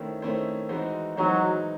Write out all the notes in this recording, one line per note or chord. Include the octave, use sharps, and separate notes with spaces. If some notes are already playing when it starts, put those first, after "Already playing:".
Already playing: D#3 A3 C#4 E4 C5
D#3 A3 C#4 E4 C5
E3 G#3 D#4 F#4 C5
E3 F#3 G#3 D#4 F#4 C5